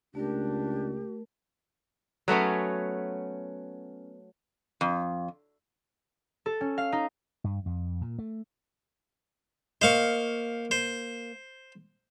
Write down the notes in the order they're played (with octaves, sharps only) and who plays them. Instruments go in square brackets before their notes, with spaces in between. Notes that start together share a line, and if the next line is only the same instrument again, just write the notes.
[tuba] C#2 [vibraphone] A3 A#4 [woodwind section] D4 [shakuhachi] G4
[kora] F#3 A3 B3 C#4
[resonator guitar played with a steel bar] F2
[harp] A4
C#4
F5
D#4
[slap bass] G2
F2
A#2
A3
[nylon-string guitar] A#3 D#5 [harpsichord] C5 F5 C#6
[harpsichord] C5